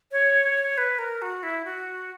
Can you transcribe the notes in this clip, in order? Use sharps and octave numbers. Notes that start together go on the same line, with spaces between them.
C#5
B4
A#4
F#4
E4
F#4